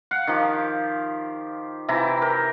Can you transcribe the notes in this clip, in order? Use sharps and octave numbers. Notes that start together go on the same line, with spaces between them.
F5 F#5
D#3 F3 G4
C3 E3 E4 A#5
A#4 G5